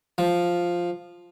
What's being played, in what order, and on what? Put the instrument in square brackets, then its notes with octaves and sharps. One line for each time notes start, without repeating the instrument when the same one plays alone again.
[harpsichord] F3